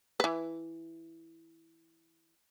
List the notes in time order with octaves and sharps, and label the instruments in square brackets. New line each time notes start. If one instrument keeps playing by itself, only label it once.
[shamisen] E3 B4